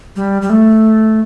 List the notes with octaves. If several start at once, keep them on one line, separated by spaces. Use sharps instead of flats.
G3
G3
A3